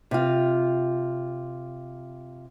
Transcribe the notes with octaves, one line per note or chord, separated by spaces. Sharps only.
C3 F4